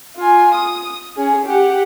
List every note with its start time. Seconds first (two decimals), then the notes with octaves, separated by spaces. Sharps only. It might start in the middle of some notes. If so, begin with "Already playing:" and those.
0.17 F4 G#5
0.54 D#6
1.16 C#4 G#4
1.46 G4 F#5